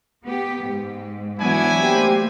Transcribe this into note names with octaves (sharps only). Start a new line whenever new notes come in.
B3 G4
G#2
E3 F#3 B3 D4 E4 G#5 G#6
A3 A#3 G4 C5 G5